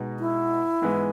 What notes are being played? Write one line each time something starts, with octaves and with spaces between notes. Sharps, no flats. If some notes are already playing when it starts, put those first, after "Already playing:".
Already playing: B2 G#3 B3 D#4
E4
G#2 E3 G#3 B3